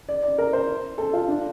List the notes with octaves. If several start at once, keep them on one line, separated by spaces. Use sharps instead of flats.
D5
D5
A#4
C5
A4
F4
D4